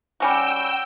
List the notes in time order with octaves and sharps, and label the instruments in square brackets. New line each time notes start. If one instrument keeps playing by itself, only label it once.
[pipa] G3 C#4 F#4 [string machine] G5 E6